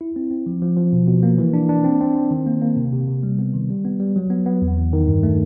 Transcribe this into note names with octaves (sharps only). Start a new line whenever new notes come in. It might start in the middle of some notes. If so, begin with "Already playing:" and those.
E4
C4
C4
F3
F3
F3
B2
B2
A#3
E3
D4
D4
C4
C4
C4
D#3
A#3
A#3
C3
C3
C3
G3
B3
D#3
G3
B3
G3
F#3
B3
B3
E2
E2
D#3
G2
A3